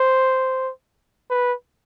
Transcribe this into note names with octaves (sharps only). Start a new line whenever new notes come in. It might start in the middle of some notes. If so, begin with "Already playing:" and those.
Already playing: C5
B4